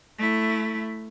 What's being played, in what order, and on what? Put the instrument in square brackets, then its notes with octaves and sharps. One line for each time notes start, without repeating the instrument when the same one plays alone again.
[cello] A3 E4